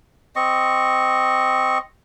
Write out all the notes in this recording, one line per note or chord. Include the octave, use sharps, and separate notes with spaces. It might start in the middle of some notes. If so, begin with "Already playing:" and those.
C4 D#5 C#6